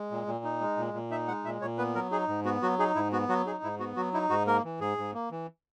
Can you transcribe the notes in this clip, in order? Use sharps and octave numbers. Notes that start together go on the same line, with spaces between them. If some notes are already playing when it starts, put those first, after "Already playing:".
Already playing: G#3
A#2
A#2
D#4
G#3
A#2
A#2
D#4 E5
G#3 F#5
A#2 E5
A#2 C#5
B3 B4
F#3 A#4
D#4 G#4
G#2
B3 F#4
F#3 F#4
D#4 G#4
G#2 E4
B3 F#4
F#3 F#4
D#4 G#4
G#2 E4
B3 F#4
F#3 F#4
D#4 E4
G#2 F#4
A#3 A#4
E3
G#2 G#4
G#2
A#3
E3